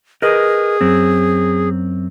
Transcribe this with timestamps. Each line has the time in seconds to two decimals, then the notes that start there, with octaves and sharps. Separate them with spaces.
0.22 G#4 A#4 B4 D#5
0.81 F#2 C4